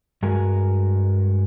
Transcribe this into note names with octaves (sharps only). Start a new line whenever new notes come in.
G2 G#3 F#4 A#4 G#5